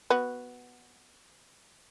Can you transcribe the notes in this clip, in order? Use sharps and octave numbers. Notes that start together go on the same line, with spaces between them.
B3 F#4